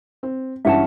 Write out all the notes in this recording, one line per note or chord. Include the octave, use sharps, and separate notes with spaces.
C4
G2 E3 C#4 E5 F#5 A5